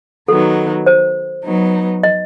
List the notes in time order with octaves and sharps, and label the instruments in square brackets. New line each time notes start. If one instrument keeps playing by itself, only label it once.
[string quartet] D#3 F#3 B3 D#4 [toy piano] A4
[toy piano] C5
[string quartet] F#3 B3 D#4
[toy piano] D#5